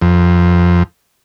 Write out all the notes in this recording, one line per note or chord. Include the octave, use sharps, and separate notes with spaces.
F2